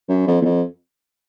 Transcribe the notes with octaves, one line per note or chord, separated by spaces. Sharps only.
F#2
F2
E2
F2